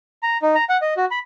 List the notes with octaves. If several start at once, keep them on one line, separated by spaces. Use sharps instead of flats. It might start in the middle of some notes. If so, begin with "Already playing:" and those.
A#5
D#4
A#5
F#5
D#5
F#4
B5